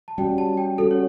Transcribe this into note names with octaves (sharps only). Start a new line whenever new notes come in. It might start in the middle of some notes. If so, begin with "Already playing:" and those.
A5
G3 C#4 F#4 G5
A5
G5
G3 C#4 F#4 A4
C#5